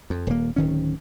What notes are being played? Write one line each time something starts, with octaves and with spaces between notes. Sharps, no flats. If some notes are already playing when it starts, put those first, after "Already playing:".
F2
D#1 A#3
D1 D#3 C#4